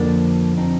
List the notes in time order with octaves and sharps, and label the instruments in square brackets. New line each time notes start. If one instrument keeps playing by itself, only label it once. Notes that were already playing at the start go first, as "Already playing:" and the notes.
Already playing: [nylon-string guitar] F2 D3 F3 A#3 D4
C4 D#4